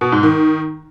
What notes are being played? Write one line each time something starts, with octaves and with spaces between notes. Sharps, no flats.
B2
G#2
D#3